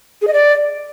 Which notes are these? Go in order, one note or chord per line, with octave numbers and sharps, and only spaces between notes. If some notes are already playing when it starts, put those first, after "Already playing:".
G#4
D#5
D5